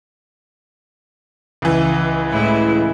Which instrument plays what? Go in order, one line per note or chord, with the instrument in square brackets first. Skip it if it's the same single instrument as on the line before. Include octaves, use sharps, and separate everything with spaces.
[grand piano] C#2 E3
[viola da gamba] A2 G#3 E4